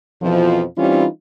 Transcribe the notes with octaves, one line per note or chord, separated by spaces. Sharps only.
F2 B2 E3 F3
E3 G3 C4 C#4 D#4 F4